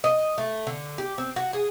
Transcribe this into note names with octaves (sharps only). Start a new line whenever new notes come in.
D#5
A3
D3
G4
C4
F#4
G#4